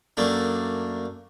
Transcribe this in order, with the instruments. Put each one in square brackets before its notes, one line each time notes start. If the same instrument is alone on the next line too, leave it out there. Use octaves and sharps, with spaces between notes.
[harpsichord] F#2 A3 A#3 D4